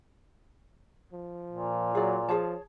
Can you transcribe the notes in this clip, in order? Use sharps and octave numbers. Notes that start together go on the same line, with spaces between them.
F3
A#2
F#3 G#4 D5
F3 G#4 C#5 A5